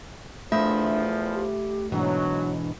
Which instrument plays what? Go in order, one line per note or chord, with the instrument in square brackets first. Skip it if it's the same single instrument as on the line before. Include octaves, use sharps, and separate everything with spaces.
[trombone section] E2 F3 [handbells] A3 [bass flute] D4 [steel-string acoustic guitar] E5
[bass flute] G4
[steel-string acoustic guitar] G#2 B2 E3 [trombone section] F#3 [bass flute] D4